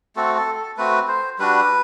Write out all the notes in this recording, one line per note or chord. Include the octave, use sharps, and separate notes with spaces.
A3 C4 F#4 A4
A4
A4
A3 C4 F#4 B4
C5
G3 D4 F#4 B4